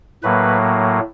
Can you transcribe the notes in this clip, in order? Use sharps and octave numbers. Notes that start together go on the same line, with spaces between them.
A2 F#3 A#3 B4